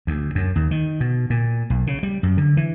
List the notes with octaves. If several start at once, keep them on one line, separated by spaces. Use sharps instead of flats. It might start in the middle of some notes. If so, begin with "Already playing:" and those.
D2
F#2
D#2
D#3
B2
A#2
B1
C#3
G3
F#2
D3
E3